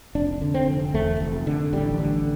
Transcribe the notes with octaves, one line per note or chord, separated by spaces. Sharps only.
F1 D4
D3
C4
F1
E2 A3
F1
D3
A1 G3
D3